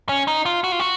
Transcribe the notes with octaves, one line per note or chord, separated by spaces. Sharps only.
C#4
D#4
F4
F#4
F4
F#4